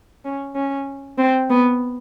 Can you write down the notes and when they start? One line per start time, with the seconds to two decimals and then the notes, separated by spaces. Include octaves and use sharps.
0.25 C#4
0.55 C#4
1.18 C4
1.50 B3